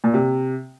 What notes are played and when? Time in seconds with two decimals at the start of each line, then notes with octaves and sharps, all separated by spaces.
0.04 A#2
0.14 C3